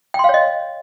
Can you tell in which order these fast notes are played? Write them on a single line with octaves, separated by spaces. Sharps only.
G5 C6 F5 C#5 D#5